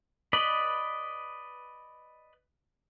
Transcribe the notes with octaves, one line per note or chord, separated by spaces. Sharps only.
B4 D5 D#5 B5